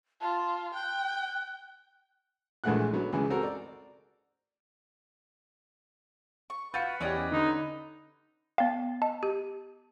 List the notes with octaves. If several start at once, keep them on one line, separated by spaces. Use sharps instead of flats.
F4 A5
G5 F#6
A#1 E3 G#3 A3 F#5 F#6
D3 F#3 B3
C#2 E3 G#3
C4 F#4 A4 A#4
D5
C#6
F4 F#4 B4 G6 C#7
E2 C#4 G4 D5 D#5
D3 D#4
B3 F5 G5
D#5 A5
G4